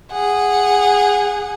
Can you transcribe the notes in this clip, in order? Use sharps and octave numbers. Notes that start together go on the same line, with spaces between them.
G#4 F#5